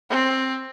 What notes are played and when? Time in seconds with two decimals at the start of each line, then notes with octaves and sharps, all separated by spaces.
0.10 C4